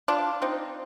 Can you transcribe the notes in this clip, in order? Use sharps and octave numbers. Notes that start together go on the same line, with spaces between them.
D4 F4
C4 D#4